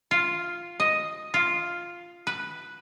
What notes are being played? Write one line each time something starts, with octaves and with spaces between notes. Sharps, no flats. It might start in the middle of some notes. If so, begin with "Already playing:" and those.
F4
D#5
F4
B4